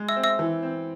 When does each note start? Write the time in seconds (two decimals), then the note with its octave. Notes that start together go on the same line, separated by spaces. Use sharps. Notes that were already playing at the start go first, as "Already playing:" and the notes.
Already playing: G#3
0.09 E5 E6
0.16 C4
0.24 E5 E6
0.39 E3
0.63 C4